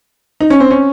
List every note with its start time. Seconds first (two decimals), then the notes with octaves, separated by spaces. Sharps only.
0.40 D#4
0.50 C#4
0.60 C4
0.71 C#4